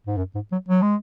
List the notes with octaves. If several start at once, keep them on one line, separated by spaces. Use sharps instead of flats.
G#2
F#2
G#2
F#3
F#3
G#3